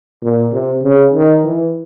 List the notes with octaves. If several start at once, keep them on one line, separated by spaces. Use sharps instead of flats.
A#2
C3
C#3
D#3
E3